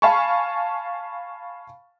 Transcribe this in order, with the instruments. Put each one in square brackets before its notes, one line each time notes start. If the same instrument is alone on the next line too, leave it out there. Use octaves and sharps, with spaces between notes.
[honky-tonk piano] F5 G#5 A5 B5 C#6